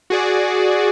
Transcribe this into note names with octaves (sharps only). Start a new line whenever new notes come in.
F#4 G#4 D5